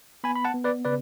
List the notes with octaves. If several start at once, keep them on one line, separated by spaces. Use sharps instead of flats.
B3 G#5 B5
B5
F#5 A5
B3
B4 D5
C#3 B4 D5